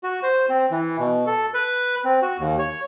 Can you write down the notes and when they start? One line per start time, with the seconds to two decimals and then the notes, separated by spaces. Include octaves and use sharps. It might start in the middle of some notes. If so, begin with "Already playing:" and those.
0.04 F#4
0.23 C5
0.49 C4
0.71 E3
0.99 B2
1.26 A4
1.54 B4
2.05 C4
2.22 F#4
2.39 D#2
2.59 C#5